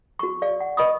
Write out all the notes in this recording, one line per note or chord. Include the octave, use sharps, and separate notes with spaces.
F#4 C#6
D5 F5
F#5
B4 D#5 B5 C#6 D#6